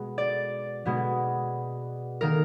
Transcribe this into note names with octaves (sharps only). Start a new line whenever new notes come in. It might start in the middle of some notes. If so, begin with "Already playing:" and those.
Already playing: B2 G#3 B3
D5
B2 G#3 B3
D#3 A#3 A#4